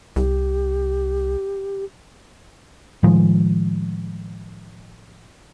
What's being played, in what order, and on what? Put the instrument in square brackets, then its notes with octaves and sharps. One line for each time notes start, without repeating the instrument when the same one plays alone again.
[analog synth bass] C2 [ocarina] G4
[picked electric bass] A2 D#3 F3 G#3